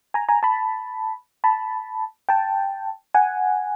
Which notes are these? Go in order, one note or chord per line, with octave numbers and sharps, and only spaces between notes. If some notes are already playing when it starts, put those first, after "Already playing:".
G#5 A#5
G#5 A#5
A5 B5
A5 B5
G5 A5
F#5 G#5